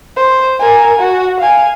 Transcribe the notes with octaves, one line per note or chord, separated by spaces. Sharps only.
C5
A#4 G#5
F#4
F5 G#5